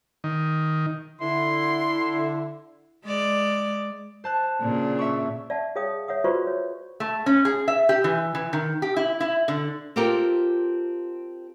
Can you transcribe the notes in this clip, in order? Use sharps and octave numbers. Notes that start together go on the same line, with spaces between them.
D#3
D3 E4 C6
G#3 D5
C5 A5 F#6
A#2 C#3 D4
E5 C#6
D5 E5 F#5 A5
G#4 C#5 F5 G5 D#6
C#5 E5 F#5 D#6
F4 F#4 B4 C5 D5 C#6
C#5
A3
C#4
G#4
E5
G4
E3
E3
D#3
G4
E4
E4
D3
C4 F4 G4 A4 A#4